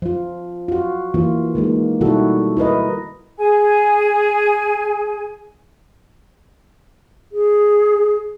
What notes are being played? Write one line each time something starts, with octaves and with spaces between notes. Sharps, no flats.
F3 F4
F4 F#4
E3 A#3 F4
D#3 G#3 A#3
B2 D#3 G3 E4 F#4 A4
E4 A#4 B4 D#5
G#4 G#5
G#4